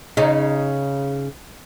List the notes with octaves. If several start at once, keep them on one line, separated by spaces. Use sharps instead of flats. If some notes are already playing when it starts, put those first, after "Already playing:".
C#3 D#4